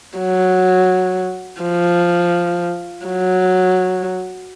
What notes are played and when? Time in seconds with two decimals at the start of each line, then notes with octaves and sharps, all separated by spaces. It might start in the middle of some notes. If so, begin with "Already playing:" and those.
0.19 F#3
1.62 F3
3.06 F#3